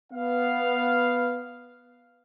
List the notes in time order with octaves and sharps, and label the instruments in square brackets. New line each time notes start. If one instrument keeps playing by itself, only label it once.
[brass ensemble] B3 F5